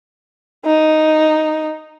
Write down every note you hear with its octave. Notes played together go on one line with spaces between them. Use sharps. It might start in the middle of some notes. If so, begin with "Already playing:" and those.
D#4